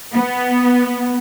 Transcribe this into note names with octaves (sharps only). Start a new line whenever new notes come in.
B3